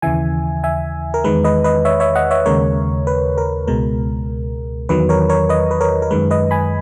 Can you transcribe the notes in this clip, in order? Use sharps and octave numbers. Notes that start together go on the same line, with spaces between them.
D#2 C#3 E3 E5 G#5
E5 G#5
A#4
E2 D#3 G#3 B4
B4 D#5
B4 D#5
C#5 E5
C#5 E5
D#5 F#5
C#5 E5
D#2 C#3 G#3 A#4 C#5
B4
A#4
C#2 B2 G#3 A#4
E2 D#3 F#3 B4
A#4 C#5
A#4 C#5
B4 D#5
B4
A#4 C#5
A#4
F#2 D#3 G#3 B4
B4 D#5
G#5 B5